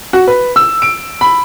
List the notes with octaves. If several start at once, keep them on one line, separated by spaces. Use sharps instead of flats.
F#4
B4
E6
D7
B5